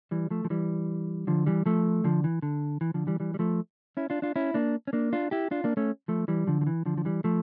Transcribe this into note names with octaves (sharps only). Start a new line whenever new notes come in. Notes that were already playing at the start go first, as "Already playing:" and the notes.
E3 G3
F3 A3
F3
E3 G3
D3 F3
E3 G3
F3 A3
D3 F3
E3
D3
E3
D3 F3
E3 G3
E3 G3
G3
F3 A3
C#4 E4
D4 F4
D4 F4
C#4 E4
A#3 D4
C#4
A#3 D4
D4 F4
E4 G4
D4 F4
A#3 D4
A3 C#4
F3 A3
E3 G3
D3 F3
F3
E3
D3 F3
F3
E3 G3
F3 A3